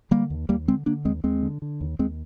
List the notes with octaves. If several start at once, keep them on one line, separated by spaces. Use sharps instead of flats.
D3 G3 A#3
D#2
D#2 G3 A#3
D3 G#3 C4
D3 A#3 D4
D#2 G#3 C4
D#2 G#3 C4
D3
D3
D#2
D#2 G#3 C4